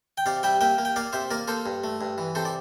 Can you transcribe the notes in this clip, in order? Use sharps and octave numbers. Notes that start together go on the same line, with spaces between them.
G5
C3 D5 F5
G3 E5 G5
A#3 E5 G5
A#3
G5
A#3 D5 F5
C3 C5 E5
A#3 A#4 D5
A#3 A4 C5
G2
A3
G2
E3
C3 A4 C5
D5